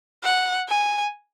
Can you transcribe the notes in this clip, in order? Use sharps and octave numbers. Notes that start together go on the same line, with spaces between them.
F#5
G#5